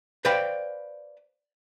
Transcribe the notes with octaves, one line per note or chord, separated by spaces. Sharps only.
B4 C5 D5 F5 G5 B5